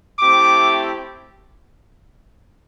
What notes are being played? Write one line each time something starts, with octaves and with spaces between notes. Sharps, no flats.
A3 C4 E4 G4 D6